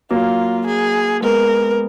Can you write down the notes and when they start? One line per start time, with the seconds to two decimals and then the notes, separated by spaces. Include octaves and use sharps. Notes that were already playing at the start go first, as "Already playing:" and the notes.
0.11 F#3 A#3 F4
0.66 G#4
1.22 G#3 B3 A#4